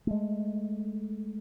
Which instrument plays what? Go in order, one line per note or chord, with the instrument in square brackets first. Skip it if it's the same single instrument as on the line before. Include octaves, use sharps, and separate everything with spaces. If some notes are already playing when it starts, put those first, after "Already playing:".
[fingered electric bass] G#3 A3